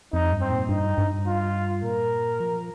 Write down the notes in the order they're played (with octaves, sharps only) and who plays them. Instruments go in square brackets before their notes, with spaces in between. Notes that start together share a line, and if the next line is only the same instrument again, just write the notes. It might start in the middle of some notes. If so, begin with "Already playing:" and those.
[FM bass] F2 [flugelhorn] D#4
[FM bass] G2
[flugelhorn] C4
[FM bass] A#2
[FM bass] G2 [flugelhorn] D#4
[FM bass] G2
[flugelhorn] F4
[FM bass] A#2 [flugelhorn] A#4
[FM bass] F3